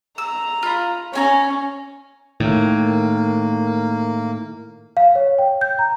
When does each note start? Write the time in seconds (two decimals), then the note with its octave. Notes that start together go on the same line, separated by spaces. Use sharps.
0.18 A#5 E6
0.63 F4 B5
1.14 C#4 C#5 G#5 A#5
2.40 A2 D#3 A#3
4.97 F5
5.15 C#5
5.39 G5
5.61 G6
5.79 A#5